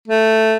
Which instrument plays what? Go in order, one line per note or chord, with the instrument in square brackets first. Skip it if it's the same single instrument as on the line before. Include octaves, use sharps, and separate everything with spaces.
[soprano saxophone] A3